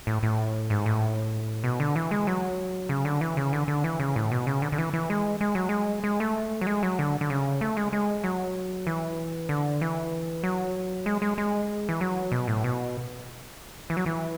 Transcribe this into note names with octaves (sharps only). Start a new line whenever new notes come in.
A2
A2
G#2
A2
B2
D3
E3
G#3
F#3
C#3
D3
E3
C#3
D3
D3
E3
C#3
A2
B2
C#3
D3
D3
E3
E3
G#3
G#3
F#3
G#3
G#3
A3
F#3
G#3
F#3
D3
D3
C#3
A3
G#3
G#3
F#3
E3
D3
E3
F#3
G#3
G#3
G#3
E3
F#3
B2
A2
B2
E3
F#3
E3